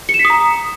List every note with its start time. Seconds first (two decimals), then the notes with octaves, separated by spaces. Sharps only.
0.09 C#7
0.14 E7
0.19 B6
0.25 D#6
0.30 A#5